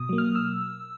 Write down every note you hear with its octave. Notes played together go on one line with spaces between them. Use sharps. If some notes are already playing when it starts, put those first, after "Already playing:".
Already playing: B2 D#6
F#3 A#3
F6
E6